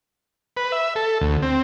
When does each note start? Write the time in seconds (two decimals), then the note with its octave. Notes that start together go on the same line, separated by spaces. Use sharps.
0.57 B4
0.72 E5
0.96 A4
1.21 D2
1.42 C4